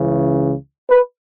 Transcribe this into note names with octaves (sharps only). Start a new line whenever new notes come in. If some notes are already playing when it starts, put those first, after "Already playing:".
Already playing: C#2 C#3 E3
B4